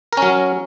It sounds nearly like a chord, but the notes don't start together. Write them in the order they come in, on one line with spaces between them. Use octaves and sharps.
A#4 C#4 F#3